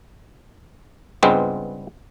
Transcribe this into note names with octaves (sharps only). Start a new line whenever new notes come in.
C#2 G2 G3 G#3 B3 C4